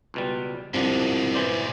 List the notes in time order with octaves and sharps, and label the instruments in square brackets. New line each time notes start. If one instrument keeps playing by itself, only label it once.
[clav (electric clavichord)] C#2 B2 G3
[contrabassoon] C2 [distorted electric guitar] G#2 B2 [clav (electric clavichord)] F3 D4
[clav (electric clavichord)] E3 C5 D5